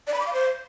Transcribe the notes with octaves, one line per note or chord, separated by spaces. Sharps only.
D5
B5
D6
F5
C5